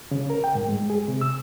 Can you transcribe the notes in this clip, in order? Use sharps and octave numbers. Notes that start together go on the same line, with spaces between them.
C#3
A#4
G5
G#2
G#3
G#4
C3
E6